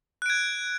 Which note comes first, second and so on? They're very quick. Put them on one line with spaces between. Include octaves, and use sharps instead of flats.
F#6 D7 G#6